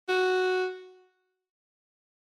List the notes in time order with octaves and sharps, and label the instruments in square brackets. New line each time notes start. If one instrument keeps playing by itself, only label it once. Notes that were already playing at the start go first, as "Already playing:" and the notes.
[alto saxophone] F#4